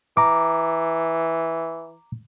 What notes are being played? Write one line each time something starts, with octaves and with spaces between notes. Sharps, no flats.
E3 A#5 D6